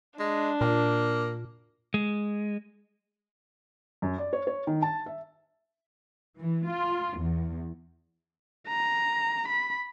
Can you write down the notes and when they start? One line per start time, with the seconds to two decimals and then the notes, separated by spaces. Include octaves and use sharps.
0.19 G#3 D4
0.61 A#2 A#3
1.94 G#3
4.02 F#2
4.18 D5
4.33 C#5
4.47 C#5
4.67 D#3
4.82 A5
5.06 E5
6.39 E3
6.69 F4
7.20 E2
8.68 A#5
9.48 B5